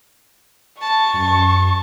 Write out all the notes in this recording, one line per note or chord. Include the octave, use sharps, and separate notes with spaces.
A5 C#6
F#2